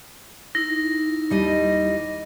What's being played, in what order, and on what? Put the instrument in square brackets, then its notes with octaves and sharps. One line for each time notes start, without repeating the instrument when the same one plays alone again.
[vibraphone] D#4 E4 [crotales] A#6
[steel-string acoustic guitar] D#2 G3 D#5